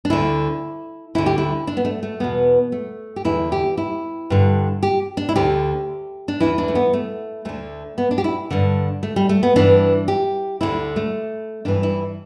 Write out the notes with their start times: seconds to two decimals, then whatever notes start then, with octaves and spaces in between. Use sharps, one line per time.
0.05 D4
0.10 D2 D3 E4
1.15 D2 D3 E4
1.26 G4
1.38 E4
1.67 D4
1.77 B3
1.85 A3
2.03 A3
2.20 E2 B2 B3
2.72 A3
3.16 G4
3.25 E2 D3 E4
3.52 G4
3.78 E4
4.30 G2 D3
4.83 G4
5.17 D4
5.29 E4
5.36 D2 D3 G4
6.28 D4
6.40 E2 E3 E4
6.58 D4
6.68 A3
6.75 B3
6.93 A3
7.45 D2 D3 A3
7.98 B3
8.11 D4
8.18 G4
8.24 E4
8.51 G2 D3
9.03 A3
9.16 G3
9.29 A3
9.43 B3
9.56 G2 E3 D4
10.08 G4
10.61 D2 D3 E4
10.96 A3
11.65 G2 E3 D4
11.83 E4